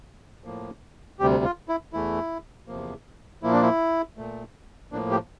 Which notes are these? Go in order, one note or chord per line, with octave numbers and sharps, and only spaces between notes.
A2 F3 A#3
D2 C3 G3 G4
F4
E4
E2 E3 A3 E4
E2 C3 F3 A#3
A#2 F3 A#3 E4
D4
E4
A#2 A3
A2 F3 A#3 D4
G4